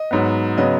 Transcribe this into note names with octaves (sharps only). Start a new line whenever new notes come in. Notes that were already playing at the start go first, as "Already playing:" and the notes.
Already playing: D#5
G#2 F#3 B3
C#3 F#3 B3 D#5